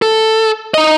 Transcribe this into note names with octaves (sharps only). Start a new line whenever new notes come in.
A4
D#4 D#5